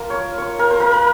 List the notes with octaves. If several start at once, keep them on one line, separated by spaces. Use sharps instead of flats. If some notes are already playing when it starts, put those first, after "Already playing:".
Already playing: A#3 F4 A#4
C#5
C#5
A#4
C5
A#4
A#4